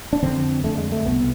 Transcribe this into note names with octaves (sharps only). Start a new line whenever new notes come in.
D4
F2 D3 C4
F2 D3 A3
G#3
A3
C2 B2 B3